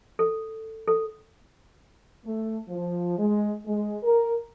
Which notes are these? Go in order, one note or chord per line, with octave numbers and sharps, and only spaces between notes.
A4
A4
A3
F3
G#3
G#3
A#4